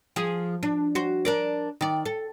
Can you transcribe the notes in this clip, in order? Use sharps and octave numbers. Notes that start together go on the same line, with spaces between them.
F3 G#4
D4
F#4 C5
D4 A#4 D5
D#3 D5
A4